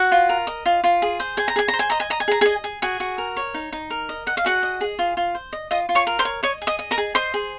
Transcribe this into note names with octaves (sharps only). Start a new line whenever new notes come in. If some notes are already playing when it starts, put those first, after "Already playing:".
Already playing: F#4 F#5
F4
A#4
D#5
F4
F4
G#4
C5
G#4 G#5
A#5
G#4 G#5
A#5
C5
G#5
D#5 A#5
G#5
D#5 A#5
G#5
G#4 A#5
G#4 D#5 G#5
G#4
F#4 G#4 G#5
F#4
A#4
C#5
D#4
D#4
A#4
D#5
D#5 F#5
F5
F#4 G#4 F#5
D#5
G#4
F4
F4
C5
D#5
F4 D#5 D#6
F4
C#5 C#6
A#4
C5 C6
C#5
C#5 D#5 C#6
G#4
D#5 D#6
D#5
A#4 A#5
G#4
C5 D#5 C6
G#4